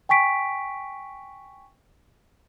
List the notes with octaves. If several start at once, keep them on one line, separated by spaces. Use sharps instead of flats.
G5 G#5 C#6 B6 D7